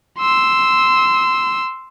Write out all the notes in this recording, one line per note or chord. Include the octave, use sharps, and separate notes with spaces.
C6 E6